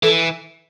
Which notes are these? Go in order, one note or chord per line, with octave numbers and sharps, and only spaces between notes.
E3 A4